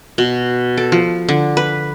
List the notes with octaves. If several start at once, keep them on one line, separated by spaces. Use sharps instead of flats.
B2
A4
F3
D3
B4